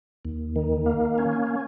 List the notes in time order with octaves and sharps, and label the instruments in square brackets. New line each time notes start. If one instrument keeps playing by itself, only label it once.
[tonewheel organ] D#2
D#3
A#3
C#4